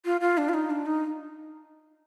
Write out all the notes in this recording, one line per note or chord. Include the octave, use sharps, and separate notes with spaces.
F4
F4
D4
F4
D#4
D4
D#4